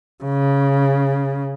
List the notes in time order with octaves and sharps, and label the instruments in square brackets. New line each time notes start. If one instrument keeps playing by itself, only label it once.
[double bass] C#3